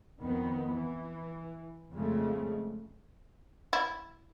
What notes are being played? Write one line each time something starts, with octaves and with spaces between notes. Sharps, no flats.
F2 D#3 B3
E3
F2 C#3 G#3 A3
E4